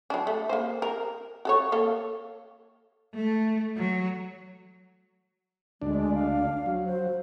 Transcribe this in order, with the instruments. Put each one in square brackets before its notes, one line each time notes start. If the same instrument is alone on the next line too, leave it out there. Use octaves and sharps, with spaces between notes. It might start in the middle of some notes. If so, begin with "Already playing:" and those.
[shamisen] F#3 D4
A3
A#3 C5
A#4
F#4 A4 C#5
A#3 A4 C#5
[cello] A3
F#3
[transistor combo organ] D2 D4 [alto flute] G#3
[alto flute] F5
[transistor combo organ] F#3
[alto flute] C5